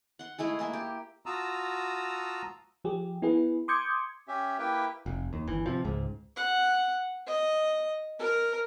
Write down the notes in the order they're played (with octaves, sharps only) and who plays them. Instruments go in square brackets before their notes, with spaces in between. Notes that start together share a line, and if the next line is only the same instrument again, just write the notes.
[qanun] F#5 C6
G#3 A3 E4 G#4
A#3 G#4 C6
G4
[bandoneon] F4 F#4 A5 A#5 D#6 E6
[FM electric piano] F3 G4 G#4
B3 E4 G#4 B4
C6 D6 D#6 G6 G#6 C#7
[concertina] C#4 G4 E5
A#3 E4 G4 B4 E5 G5
[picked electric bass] F1
D#2
G1 E3
C3 F3
C#2 G#2
[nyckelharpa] F#5
D#5
A#4